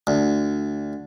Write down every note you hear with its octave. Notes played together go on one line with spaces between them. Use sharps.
D2